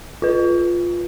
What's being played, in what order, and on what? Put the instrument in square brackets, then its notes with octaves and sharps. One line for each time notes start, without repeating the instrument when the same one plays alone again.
[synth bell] F4 B4